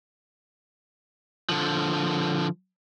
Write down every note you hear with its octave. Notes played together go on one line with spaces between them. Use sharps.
D3 F3